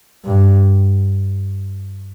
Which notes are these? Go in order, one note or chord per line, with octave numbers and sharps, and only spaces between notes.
G2